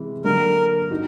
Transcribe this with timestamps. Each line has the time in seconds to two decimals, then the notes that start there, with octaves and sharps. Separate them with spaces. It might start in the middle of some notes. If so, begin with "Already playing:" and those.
Already playing: C3 E3 G#3
0.24 D3 F#3 A#3 A#4
0.91 D#4 F#4